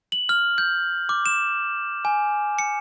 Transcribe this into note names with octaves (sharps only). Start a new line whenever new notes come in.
F#7
F6
G6
D6
E7
G#5
C#7